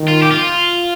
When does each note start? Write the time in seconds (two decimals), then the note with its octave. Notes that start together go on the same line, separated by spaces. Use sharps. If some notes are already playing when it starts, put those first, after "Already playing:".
Already playing: D#3
0.08 F4
0.22 G4
0.31 F4